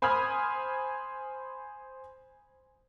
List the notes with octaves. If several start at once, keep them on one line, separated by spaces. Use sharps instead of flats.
C5 G#5 B5 D#6 F6 G#6